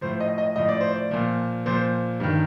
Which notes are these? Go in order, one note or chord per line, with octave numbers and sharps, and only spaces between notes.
A2 F3 C5
D#5
D#5
A2 F3 D#5
D5
C5
D5
A#2 F3
A#2 F3 C5
G2 D#3